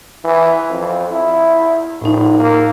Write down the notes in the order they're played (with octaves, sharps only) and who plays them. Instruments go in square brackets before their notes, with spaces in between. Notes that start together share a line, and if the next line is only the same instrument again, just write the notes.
[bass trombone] E3
F2
E4
[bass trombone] A#1 [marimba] A2 D#4
[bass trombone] A#3